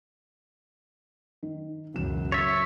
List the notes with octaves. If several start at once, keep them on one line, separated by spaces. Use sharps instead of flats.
D#3
E1 C#2 F#2 C#4 E7
C#5 E5 A6